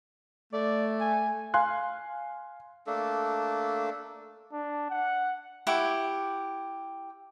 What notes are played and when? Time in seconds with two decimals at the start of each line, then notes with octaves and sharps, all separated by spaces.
0.53 A3 D5
1.00 G#5
1.54 F5 G#5 C6 F#6
2.87 A3 A#3 D4 A4
4.53 D4
4.91 F#5
5.67 E4 G4 F#5 C#6